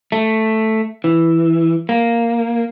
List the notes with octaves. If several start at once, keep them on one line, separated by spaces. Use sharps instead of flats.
A3
E3
A#3